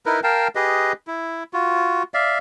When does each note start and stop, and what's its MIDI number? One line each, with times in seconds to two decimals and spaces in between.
0.06 0.20 63
0.06 0.20 64
0.06 0.20 70
0.06 0.20 71
0.23 0.48 70
0.23 0.48 77
0.23 0.48 79
0.23 0.48 81
0.55 0.93 67
0.55 0.93 68
0.55 0.93 71
0.55 0.93 75
1.07 1.43 64
1.53 2.03 65
1.53 2.03 66
2.14 2.38 74
2.14 2.38 76
2.14 2.38 77